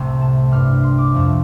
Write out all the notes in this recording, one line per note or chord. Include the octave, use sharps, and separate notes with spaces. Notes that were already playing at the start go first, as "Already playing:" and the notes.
Already playing: C2 A2 C3 A3 C6
A5
G2 G3 F6
C6
D6
F2 F3 A3